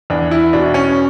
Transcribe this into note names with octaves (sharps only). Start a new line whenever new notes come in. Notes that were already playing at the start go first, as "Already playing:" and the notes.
E2 D4
E4
B2 D4
C#4